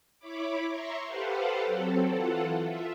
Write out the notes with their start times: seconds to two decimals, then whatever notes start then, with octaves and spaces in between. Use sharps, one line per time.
0.19 E4 C#5 B5 D6
0.67 E5 A#5 C6 C#6
1.06 G4 A4 B4 C5 F5 F#5
1.65 F#3 C4 A4
2.07 E3 F4 A4 F#5
2.63 F4 E5